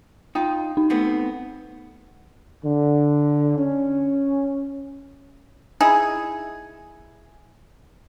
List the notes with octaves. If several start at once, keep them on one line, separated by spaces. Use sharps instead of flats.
D#4 F4 G5 D#6
D#4
A3 B3 C4
D3
C#4
D#4 E4 G#4